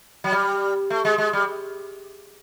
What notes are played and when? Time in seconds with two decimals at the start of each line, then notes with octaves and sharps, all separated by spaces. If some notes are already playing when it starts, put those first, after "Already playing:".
0.24 F#3
0.32 G3
0.90 A3
1.05 G#3
1.18 G#3
1.33 G3